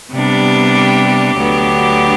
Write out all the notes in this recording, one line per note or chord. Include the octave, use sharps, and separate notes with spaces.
C3 G3 B3 D4
G4
G4
D2 D3 F#3 B3 D4